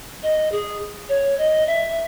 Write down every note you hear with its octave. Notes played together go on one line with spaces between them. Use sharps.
D#5
G#4
C#5
D#5
E5